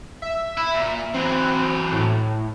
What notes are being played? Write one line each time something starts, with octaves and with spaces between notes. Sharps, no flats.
E5
E4
A#2
E3 F#3 C4
A2